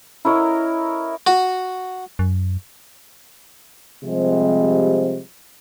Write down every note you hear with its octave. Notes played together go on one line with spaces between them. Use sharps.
E4 A#4 C#5 D#5
F#4
F#2
C3 F3 G3 G#3 C4